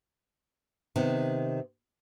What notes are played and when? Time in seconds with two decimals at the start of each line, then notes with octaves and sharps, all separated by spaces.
0.96 C3 D#3 B3